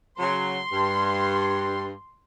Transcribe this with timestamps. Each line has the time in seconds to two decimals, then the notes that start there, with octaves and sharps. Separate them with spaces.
0.19 C#3 F#3 C6
0.72 G2